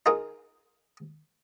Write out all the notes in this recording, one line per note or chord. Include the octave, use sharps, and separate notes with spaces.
D#4 F4 G#4 A#4